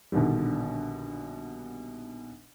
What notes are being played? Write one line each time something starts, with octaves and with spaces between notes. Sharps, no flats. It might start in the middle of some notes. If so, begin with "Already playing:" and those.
A#1 B2 D3 D#3 G3